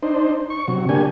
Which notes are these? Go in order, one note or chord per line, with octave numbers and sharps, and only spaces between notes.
D4 D#4 C5
C#6
C3 F#3
D3 A#3 D4 G4 G#5